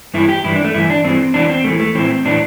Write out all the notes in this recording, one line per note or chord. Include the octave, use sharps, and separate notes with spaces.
G2 E3 E4
G4
G2 E3 E4
D4
A3
G2 E3 E4
D4
G2 E3 C4
E2 E3 D4
C4
E2 E3 A3
A3
A2 E3 C4
A2 E3 D4